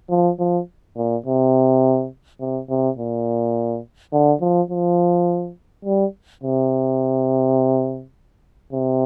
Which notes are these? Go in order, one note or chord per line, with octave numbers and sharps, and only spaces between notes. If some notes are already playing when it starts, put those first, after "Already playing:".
F3
F3
A#2
C3
C3
C3
A#2
D3
F3
F3
G3
C3
C3